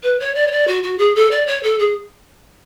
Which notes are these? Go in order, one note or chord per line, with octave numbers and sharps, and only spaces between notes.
B4
C#5
D5
C#5
D5
F#4
F#4
G#4
A4
D5
C#5
A4
G#4